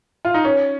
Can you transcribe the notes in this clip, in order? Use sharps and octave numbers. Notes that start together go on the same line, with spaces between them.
F4
D#4
C#4